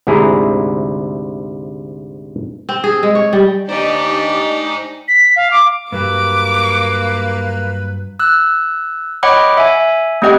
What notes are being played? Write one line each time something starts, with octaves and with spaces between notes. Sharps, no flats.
D2 G#2 C3 E4 G#4 A#5
C4
G#4
G#3
C#5
G3
D#2 D4 D#4 G4 C5 D5 G#5
B6
F5
D6
G2 F#3 A#3 G4 B4 D6
E6 F#6
C#5 D#5 F#5 G5 B5 D6
E5 G#5
A3 C4 G4 D#5 F#5 G5